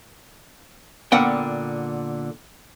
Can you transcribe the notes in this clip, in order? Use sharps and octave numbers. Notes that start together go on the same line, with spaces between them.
A#2 D3 B3 F#5 G5